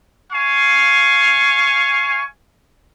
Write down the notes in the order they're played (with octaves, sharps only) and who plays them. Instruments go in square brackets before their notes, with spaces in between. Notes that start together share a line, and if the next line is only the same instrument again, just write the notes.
[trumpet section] F5 G#5 C#6